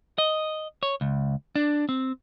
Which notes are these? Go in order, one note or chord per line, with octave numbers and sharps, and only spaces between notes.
D#5
C#5
C#2
D4
C4